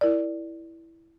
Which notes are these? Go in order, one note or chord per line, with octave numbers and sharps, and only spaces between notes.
E4 A#4 D5